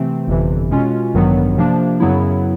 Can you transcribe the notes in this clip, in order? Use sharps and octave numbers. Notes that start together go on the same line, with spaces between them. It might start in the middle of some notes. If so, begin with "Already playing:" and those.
Already playing: C3 E3 A3 C4
G1 F2 C3 E3
B2 G#3 C#4 F4
A1 G2 D#3 F#3 B3
C3 F3 A#3 D4
F#2 C#3 F#3 B3 E4